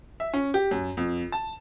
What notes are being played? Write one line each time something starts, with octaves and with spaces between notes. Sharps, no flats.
E5
C#4
G4
F#2
F2
A5